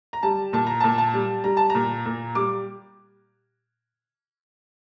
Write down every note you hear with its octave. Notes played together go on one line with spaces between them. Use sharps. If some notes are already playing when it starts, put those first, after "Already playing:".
A#5
G3 A5
A#2 A5
A#5
A#2 A5
A5
G3
G3 A#5
A5
A#5
A#2
A#2
G3 D6